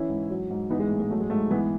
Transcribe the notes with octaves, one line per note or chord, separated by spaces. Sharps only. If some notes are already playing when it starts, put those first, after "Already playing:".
Already playing: E3 C#4 E4
G#2
F#3
G#2
E3 B3 D#4
G#3
A2
G#3
F#3 A3
G#3
G#2 A3
E3 G#3 B3